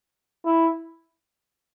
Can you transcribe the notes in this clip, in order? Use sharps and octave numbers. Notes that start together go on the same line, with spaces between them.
E4